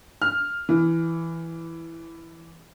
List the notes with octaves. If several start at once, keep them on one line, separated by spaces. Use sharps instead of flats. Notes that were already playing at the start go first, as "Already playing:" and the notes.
F6
E3